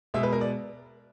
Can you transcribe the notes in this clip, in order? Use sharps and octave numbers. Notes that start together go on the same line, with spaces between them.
B2 G#3 E5
B4
A#4
D5